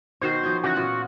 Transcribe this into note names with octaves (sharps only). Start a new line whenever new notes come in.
B2 D#3 F#4 C5
F3 D#4 C#5
C#3 E3 F#4
A#2 B3 F4